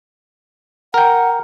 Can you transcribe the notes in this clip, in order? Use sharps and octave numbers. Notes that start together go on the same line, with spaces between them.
A#4 F#5 G5